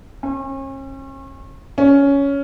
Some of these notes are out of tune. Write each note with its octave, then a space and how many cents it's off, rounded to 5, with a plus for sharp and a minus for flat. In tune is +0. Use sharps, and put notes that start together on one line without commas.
C#4 -40
C#4 +10